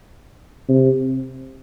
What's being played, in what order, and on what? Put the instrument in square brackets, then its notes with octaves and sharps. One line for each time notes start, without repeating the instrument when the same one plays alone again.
[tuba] C3